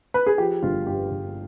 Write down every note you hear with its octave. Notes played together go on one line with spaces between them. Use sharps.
B4
G#4
F3 G4
G1 F4
G2 G4
G1